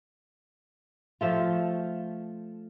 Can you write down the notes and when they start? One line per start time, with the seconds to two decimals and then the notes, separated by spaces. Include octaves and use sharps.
1.21 F3 A3 F4